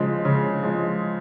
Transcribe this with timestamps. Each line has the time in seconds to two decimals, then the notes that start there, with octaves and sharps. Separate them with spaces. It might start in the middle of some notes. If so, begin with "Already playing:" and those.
Already playing: C#3 F3 G#3
0.25 C#3
0.62 F3 G#3